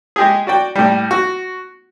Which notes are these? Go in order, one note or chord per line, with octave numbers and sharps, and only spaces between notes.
G#3 G4 G#4
F#4 D5 G5
A2 G3
F#4